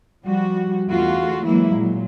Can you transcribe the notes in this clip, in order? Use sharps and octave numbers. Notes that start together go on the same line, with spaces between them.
F3 G3 F#4
E2 D3 A3 F4 F#4
E3 F#3 G#3 A#3 E4
A#2 F#3